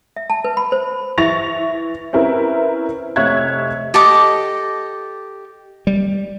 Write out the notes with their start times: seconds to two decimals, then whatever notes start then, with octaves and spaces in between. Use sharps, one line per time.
0.16 E5
0.30 A5
0.44 B4
0.57 B5
0.72 C5
1.18 E3 E4 C#6 A6 A#6 F7
2.13 C4 C#4 E4 A#4 B4
3.16 F1 C4 C#5 E5 F#6 G#6
3.94 G4 A4 D#5 D6
5.87 G3